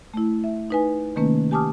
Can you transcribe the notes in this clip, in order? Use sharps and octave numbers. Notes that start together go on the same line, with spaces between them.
A3 E4
E5
D#4 B4 G#5
C3 D#3 A3 A#3 C#4 B4
G4 G#5 A5 D6 D#6 F6